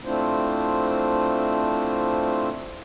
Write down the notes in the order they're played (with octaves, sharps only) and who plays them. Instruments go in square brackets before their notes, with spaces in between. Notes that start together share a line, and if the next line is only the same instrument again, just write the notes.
[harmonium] A3 C4 D4 E4 F4 C5